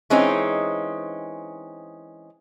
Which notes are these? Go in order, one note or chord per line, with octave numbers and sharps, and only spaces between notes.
E3 G#3 C4 C#4 D#4